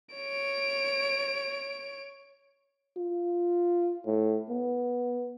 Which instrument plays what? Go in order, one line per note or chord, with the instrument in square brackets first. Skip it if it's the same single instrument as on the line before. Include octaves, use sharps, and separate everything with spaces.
[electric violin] C#5 D7
[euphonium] F4
A2
B3